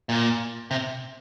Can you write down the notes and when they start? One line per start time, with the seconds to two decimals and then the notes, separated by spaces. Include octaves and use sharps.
0.09 A#2
0.71 C3